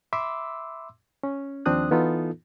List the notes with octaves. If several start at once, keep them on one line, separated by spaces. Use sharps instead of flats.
E5 B5 C6 D6 E6
C#4
D#2 F3 C4 D4 D#6 F#6
E3 B3 D#4 F4 A4